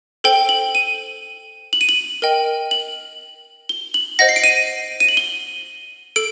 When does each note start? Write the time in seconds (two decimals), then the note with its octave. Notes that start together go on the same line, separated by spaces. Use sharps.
0.24 A4 C5 G5 G7
0.49 F#7
0.75 D#7
1.73 F#7
1.81 D#7
1.89 F#7
2.22 A#4 D#5 G5
2.71 F#7
3.69 G7
3.94 F#7
4.19 C5 D#5 F#5 A#6
4.29 C7
4.36 D7
4.44 D#7
5.00 D#7
5.08 F#7
5.17 G7
6.16 A4 D7